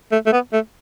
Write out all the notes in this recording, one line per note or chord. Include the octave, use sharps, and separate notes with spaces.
A3
A3
B3
A3